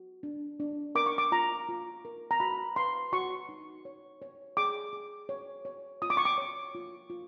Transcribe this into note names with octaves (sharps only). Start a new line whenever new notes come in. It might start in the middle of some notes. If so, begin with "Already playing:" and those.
Already playing: F#4
D4
D4
A#4 D6
C#6
D6
F4 A#5
F4
A#4
A#5
F#4 B5
B4 C6
F#4 C#6
D#4
C#5
C#5
G#4 D6
G#4
C#5
C#5
F4 D#6
D6
C#6
D6
C#5
F4
F4